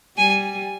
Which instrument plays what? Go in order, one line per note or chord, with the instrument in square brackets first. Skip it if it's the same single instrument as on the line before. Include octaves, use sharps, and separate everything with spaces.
[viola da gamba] G3 [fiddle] G#5